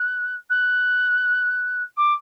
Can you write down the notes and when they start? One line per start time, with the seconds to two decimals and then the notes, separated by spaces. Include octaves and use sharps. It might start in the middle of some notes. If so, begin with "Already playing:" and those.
Already playing: F#6
0.49 F#6
1.97 D6